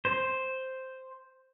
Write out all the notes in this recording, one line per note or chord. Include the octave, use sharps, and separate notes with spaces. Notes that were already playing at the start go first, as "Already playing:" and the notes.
C5